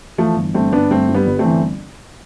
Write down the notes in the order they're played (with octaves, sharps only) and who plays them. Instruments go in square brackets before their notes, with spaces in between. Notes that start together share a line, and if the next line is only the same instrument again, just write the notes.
[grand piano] E3 [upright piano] F3 A3
[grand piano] G1
[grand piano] G2 [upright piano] A3 C4
[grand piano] G1 [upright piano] B3 D4
[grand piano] G2 [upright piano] A3 C4
[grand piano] G2
[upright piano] G3 B3
[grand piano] G1
[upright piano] A3 C4
[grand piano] E3